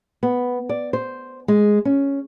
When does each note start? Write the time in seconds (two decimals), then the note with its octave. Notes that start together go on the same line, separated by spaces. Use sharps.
0.23 B3
0.69 D5
0.93 C5
1.48 G#3
1.85 C#4